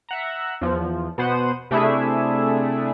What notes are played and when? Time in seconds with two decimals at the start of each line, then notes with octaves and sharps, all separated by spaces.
0.09 E5 F#5 A#5
0.61 E2 F3
1.18 B2 B3 C5 F#5 D#7
1.71 C3 A3 D4 E4 G#4 E5